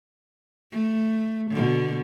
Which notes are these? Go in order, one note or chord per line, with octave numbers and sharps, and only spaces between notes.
A3
B2 D3